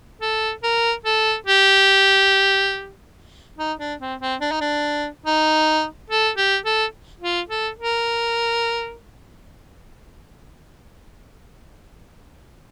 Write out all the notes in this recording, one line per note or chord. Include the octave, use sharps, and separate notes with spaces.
A4
A#4
A4
G4
D#4
D4
C4
C4
D4
D#4
D4
D#4
A4
G4
A4
F4
A4
A#4